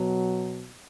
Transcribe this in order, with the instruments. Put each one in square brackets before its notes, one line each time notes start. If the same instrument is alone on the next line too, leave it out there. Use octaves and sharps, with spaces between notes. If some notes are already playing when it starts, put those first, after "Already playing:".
Already playing: [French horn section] B2 F#3